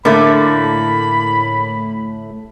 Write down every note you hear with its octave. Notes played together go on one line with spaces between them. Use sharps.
A2 D3 A3 A#3 B5